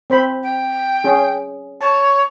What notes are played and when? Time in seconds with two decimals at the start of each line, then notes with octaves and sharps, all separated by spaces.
0.10 C4 C5 B5
0.43 G5
1.04 C#4 G#4
1.81 C#5 A5